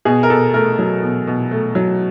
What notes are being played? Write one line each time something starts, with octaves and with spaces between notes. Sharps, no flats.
B2 G#4
A#4
B2 A4
A3 A#4
F#3
B2
B2
A3
F#3